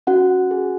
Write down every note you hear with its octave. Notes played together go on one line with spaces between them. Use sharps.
C#4 F#4 F#5
G#4